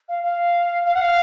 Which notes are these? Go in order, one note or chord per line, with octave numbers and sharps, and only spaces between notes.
F5
F5
F5
F#5
F5